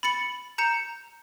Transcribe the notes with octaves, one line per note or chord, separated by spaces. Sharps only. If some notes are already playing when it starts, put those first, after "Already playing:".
B5 A6 C#7 F#7
A#5 G6 C#7 E7